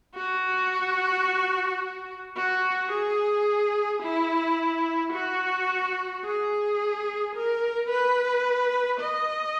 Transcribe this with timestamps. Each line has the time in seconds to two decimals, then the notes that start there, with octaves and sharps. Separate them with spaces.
0.15 F#4
2.37 F#4
2.92 G#4
4.03 E4
5.13 F#4
6.24 G#4
7.35 A#4
7.90 B4
9.01 D#5